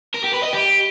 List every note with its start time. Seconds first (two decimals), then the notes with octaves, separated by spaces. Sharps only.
0.14 A#4
0.24 G4
0.33 B4
0.43 D#5
0.53 G4